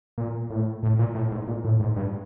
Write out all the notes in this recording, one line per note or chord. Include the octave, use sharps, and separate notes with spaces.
A#2
A2
A2
A#2
A2
G#2
A#2
A2
G#2
G2